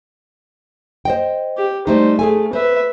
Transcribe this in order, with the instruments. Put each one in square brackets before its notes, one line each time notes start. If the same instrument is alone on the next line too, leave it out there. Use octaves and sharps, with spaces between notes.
[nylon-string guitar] C5 D#5 G5
[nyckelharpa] G4
[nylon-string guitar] G3 A3 D#4 [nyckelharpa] C5
[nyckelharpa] A3 [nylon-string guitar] G#4 A4 G#5
[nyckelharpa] B4 E5 [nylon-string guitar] C5